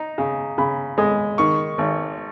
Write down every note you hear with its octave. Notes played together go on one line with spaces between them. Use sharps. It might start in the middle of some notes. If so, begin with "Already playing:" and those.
Already playing: D#4 A#5
C#3
C#3 B5
G#3 D#6
D#3 C#6
G#1